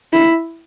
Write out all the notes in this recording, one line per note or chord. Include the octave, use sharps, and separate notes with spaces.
E4